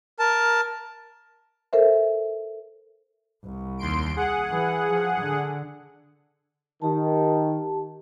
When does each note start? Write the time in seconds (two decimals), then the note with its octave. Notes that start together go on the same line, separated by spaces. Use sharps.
0.19 A#4 A5
1.73 A4 A#4 C5 E5
3.44 C2
3.78 D#2 C6 D7
4.16 G#4 F#5
4.49 E3
4.92 F3
5.21 D3
6.82 D#3 G4 A5